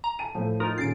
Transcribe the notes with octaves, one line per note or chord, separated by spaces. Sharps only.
A#5
A5 D#7
A2 F3 A3
D#4 F4 A#4
D#1 C#3 A6 C7 D7